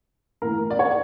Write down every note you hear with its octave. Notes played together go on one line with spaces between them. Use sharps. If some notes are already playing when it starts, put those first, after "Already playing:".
A2 E3 A#4
D5
C#5